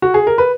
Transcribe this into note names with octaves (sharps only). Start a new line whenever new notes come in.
F#4
G#4
A#4
B4